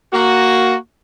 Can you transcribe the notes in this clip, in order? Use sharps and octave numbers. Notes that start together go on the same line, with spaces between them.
A#3 F#4